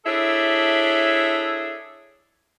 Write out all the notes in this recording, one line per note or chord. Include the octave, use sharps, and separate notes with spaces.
D4 E4 G#4 A4 C#5 E5